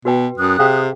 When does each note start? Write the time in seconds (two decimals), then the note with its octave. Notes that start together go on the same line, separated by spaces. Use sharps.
0.05 B2 F#4 B4 G5
0.38 F#2 D#6 F#6
0.59 C3 G#4 F5 G5